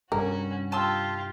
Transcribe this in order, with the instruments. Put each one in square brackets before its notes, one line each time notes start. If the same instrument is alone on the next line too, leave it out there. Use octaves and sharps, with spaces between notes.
[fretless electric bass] C2 G2 [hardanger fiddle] C#4 F#4 [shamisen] A#4
[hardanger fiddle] F4 G4 [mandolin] A5 C6 E6